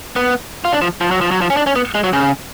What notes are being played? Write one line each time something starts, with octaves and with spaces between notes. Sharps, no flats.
B3
F4
D4
F3
F3
F#3
F3
F#3
F3
C#4
D4
C#4
B3
G#3
F#3
C#3